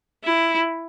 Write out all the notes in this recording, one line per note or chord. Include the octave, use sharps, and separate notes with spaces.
E4